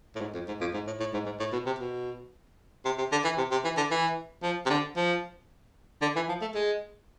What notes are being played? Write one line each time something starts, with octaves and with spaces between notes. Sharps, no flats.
A2
G#2
F2
G#2
F2
G#2
A2
A2
G#2
G#2
A2
B2
C3
B2
C3
C3
D3
E3
C3
C3
E3
D3
E3
F3
C3
D3
F3
D3
E3
F3
A3
G#3